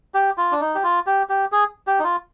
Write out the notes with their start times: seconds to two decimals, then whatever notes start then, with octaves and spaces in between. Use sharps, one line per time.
0.14 G4
0.38 F4
0.52 D4
0.61 D#4
0.75 G4
0.83 F4
1.07 G4
1.29 G4
1.52 G#4
1.87 G4
1.99 D#4
2.04 F4